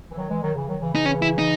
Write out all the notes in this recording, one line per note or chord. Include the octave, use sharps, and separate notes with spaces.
E3
D#3 F#3
E3 G#3
D#3 F#3
C#3 E3
D#3 F#3
C#3 E3
C#3 E3 D#4
C#4
E4
D#4